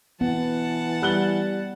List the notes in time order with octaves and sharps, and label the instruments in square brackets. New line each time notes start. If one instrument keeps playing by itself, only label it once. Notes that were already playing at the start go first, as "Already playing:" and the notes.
[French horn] E3 [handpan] B3 [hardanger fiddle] F#5 A5
[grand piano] G3 F#6 G7